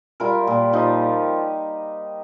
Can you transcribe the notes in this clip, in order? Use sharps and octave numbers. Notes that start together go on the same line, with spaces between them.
G3 F4 A#4
A#2
F3 D#4 G4